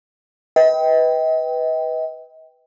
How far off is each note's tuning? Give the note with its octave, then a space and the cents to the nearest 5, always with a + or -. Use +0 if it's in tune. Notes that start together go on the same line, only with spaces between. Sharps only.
B4 +0 D#5 +40 G5 +0